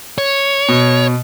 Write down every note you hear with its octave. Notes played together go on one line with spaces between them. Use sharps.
C#5
B2